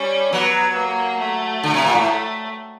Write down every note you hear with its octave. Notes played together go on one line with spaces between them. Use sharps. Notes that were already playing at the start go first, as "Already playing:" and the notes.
Already playing: G3 C#4
F#3 B3
A#3
A3
D3
C3
A#2
A2
A3